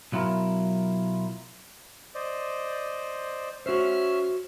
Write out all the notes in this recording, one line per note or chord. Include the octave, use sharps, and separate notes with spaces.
B1 F#3 E4 F4 A#4
C5 D5 D#5
C#4 F#4 C5 E5 F6